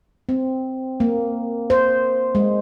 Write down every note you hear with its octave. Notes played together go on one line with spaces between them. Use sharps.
C4
A#3
C5
G#3